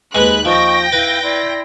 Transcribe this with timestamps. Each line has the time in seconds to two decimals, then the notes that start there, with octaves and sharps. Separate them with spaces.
0.15 D#2 G#3 B4 F#6
0.45 F3 D#5 G5 C#6 A#6
0.92 E4 B4 F5
1.22 E4 D5 C6